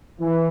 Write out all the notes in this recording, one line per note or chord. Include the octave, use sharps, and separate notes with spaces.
E3